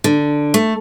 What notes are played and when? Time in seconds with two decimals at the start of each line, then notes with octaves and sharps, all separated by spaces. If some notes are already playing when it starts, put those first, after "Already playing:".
0.04 D3
0.54 A3